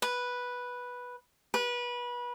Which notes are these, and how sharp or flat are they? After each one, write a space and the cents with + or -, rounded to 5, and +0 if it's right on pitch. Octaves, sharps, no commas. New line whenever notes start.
B4 -5
B4 -25